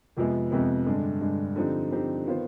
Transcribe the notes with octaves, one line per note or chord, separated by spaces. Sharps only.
F2 C3 F3 G#3 B3
F2 C3 F3 G#3 B3
G2 D3 G#3
G2 D3 G#3
D3 F3 C4 D#4 G4
D3 F3 C4 D#4 G4
D#3 B3 F4 C5